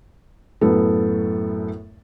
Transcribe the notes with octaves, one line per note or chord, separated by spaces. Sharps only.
F#2 A2 B3 A4